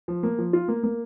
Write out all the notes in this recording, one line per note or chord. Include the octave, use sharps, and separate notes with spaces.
F3
A#3
F3
F4
A#3
A#3